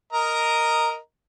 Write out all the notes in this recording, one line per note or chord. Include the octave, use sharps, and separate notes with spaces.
A#4 D#5 A#5